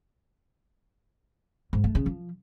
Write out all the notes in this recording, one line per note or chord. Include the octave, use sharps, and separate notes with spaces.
G#2
A3
C#3
F3